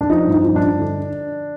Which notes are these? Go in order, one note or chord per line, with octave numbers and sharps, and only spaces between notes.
D4
F3 D#4
G2
D#4
F3
D4
G2
D3